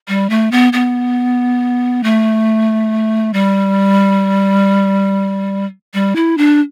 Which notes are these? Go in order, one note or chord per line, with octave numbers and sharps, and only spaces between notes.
G3
A3
B3
B3
A3
G3
G3
E4
D4